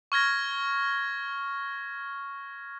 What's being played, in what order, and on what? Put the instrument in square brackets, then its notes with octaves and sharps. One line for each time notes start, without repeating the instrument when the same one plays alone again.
[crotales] C#6 F6 G#6 A#6